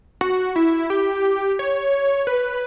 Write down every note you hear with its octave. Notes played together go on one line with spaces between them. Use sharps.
F#4
E4
G4
C#5
B4